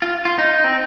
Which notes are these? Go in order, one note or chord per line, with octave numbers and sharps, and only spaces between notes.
F4
F4
D#4
C4